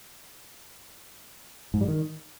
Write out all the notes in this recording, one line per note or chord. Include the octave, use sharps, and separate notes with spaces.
G#2
G3
D#3